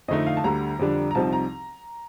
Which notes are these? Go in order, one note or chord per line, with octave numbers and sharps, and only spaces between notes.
F2 D3 A3 D#4 D#5
F5
A5
D2 D3 G3 A#5
F2 D3 G3 D4
A#5
C2 C3 F3 C4 D#4 A5
A#5